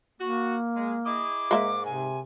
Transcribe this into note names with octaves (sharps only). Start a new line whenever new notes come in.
A#3 F#4
G#3
E4 G#4 D#5 D6
G#2 G#3 A#3 E5
C3 G#5